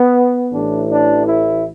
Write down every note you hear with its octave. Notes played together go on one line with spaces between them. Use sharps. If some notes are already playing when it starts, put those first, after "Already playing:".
Already playing: B3
A1 A2 E3 D4
D4
E4